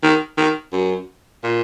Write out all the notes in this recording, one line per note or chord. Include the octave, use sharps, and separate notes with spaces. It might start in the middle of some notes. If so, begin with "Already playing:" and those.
D#3
D#3
F#2
A#2